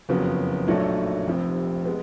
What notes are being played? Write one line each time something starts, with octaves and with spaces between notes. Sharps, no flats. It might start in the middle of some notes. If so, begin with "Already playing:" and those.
F#1 F2 C#3 F#3 B3
B1 A#2 F#3 A3 D4
F1 F2 C3
G#3 B3